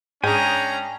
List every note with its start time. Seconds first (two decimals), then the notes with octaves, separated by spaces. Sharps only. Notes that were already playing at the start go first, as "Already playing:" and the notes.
0.24 G#2 G#3 C#4 D4 G5 G#5 A#5 D#6